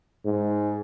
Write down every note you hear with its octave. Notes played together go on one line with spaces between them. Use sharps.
G#2